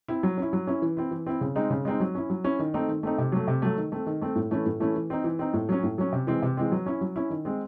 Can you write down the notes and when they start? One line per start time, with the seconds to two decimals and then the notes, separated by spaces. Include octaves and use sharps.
0.08 C4 E4
0.23 F#3
0.38 C#4 E4
0.53 F#3
0.67 C#4 E4
0.82 E3
0.97 C4 E4
1.11 E3
1.26 C4 E4
1.41 C#3
1.56 G#3 C4 D#4
1.70 C#3
1.85 G#3 C4 D#4
2.00 F#3
2.15 C#4 E4
2.30 F#3
2.44 C#4 E4
2.59 D#3
2.74 A3 C4 D#4
2.88 D#3
3.03 A3 C4 D#4
3.18 C3
3.32 F#3 A3
3.48 C3
3.62 F#3 A3
3.77 D#3
3.92 A3 C4
4.06 D#3
4.21 A3 C4
4.36 A2
4.51 E3 A3 C#4 E4
4.66 A2
4.80 E3 A3 C#4 E4
4.95 E3
5.10 C4 D#4
5.24 E3
5.39 C4 D#4
5.54 A2
5.69 F#3 C#4
5.83 A2
5.98 F#3 C#4
6.13 C3
6.27 E3 G#3 C4
6.42 C3
6.57 E3 G#3 C4
6.72 F#3
6.86 C#4 E4
7.01 F#3
7.16 C#4 E4
7.30 D#3
7.45 G#3 C4